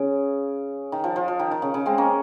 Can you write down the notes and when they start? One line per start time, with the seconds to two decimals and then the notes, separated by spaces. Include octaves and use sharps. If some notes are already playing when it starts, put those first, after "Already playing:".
Already playing: C#3
0.92 D#3
1.04 F3
1.16 F3
1.28 F3
1.39 D#3
1.51 D#3
1.62 C#3
1.74 C#3
1.86 G#3 C4
1.98 A#3 C#4